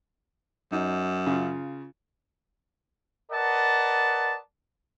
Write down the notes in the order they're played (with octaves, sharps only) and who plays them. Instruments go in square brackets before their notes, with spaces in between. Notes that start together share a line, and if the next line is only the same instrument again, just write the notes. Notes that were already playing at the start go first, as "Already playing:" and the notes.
[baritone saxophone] F#2 [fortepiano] D#4
[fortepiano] C#3 F4
[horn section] A#4 B4 D5 D#5 F#5 A5